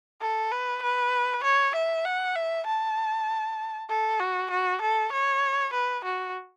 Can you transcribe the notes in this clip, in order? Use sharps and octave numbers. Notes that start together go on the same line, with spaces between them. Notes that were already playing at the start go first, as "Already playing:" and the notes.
A4
B4
B4
C#5
E5
F#5
E5
A5
A4
F#4
F#4
A4
C#5
B4
F#4